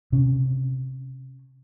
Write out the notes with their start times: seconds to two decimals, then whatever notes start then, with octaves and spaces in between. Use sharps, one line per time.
0.12 C3 C#4